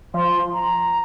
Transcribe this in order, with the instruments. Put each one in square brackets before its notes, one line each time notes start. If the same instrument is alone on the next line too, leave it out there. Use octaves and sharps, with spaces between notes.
[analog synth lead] F3 [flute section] C6
[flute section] A#5